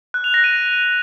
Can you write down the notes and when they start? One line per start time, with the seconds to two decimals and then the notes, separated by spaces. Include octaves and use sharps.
0.14 F#6
0.24 F7
0.34 A#6
0.44 D#7